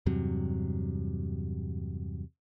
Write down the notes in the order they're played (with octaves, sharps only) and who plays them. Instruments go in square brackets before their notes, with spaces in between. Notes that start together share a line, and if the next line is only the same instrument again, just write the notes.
[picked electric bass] E2 G2 C3 F#3